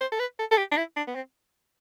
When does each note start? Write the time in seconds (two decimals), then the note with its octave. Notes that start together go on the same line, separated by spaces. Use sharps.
0.01 C5
0.12 A4
0.20 B4
0.39 A4
0.51 A4
0.58 G4
0.71 D4
0.77 E4
0.96 D4
1.07 B3
1.15 C4